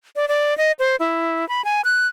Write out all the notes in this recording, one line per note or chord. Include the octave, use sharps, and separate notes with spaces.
D5
D5
D#5
C5
E4
B5
G#5
F#6